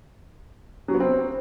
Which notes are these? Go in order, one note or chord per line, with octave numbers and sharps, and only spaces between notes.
F#3
B3
C4